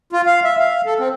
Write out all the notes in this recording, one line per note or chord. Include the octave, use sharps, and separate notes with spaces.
F4
F5
E5
F5
A4
C4